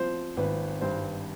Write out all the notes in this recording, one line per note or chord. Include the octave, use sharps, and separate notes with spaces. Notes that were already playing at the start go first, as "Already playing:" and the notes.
Already playing: F3 C4 C5
G#1 B4
G2 C5